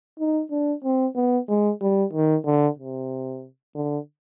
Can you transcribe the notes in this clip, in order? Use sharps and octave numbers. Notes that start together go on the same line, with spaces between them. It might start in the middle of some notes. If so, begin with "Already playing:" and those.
D#4
D4
C4
B3
G#3
G3
D#3
D3
C3
D3